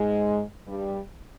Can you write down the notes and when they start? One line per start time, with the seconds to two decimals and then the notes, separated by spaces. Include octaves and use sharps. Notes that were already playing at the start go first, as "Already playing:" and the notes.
Already playing: G#2 G#3
0.67 G2 G3